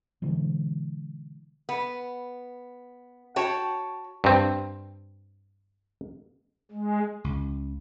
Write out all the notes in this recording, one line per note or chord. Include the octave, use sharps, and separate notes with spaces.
B2 D3 E3 G#3
B3
F#4 C#5 G5 A5
G2 C4
G#3
C#2